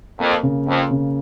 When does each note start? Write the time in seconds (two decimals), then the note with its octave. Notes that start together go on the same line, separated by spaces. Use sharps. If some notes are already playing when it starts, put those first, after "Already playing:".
0.19 F2 A#3
0.43 C#3
0.66 F2 A#3
0.91 C#3